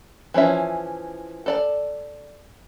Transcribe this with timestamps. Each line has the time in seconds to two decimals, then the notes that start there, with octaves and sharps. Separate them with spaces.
0.34 E3 F3 C#4 E5
1.46 A4 D5 A5